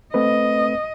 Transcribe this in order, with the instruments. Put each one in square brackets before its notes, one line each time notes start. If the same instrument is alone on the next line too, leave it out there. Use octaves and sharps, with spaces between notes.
[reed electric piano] A3 C4 B4 [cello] D#5